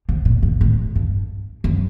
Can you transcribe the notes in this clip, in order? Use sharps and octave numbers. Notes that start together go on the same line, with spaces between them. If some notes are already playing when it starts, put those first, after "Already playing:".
C3
A#2
G2
A2
G2
F#2